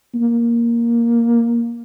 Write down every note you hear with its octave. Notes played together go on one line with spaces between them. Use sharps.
A#3